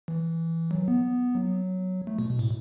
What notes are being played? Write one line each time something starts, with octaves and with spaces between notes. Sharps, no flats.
E3
F#3
B3
F#3
A3
B2
B2
A2